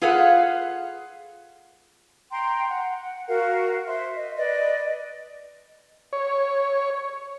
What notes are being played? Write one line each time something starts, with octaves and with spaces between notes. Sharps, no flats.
F4 G#4 A4 B4 F5 F#5
G5 A#5 C6
F#5
F#4 A#4 F5 F#5
C5 E5 C6
D#5
B4 D5 D#5
C#5